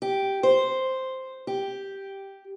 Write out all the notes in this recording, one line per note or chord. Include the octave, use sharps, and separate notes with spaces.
G4
C5
G4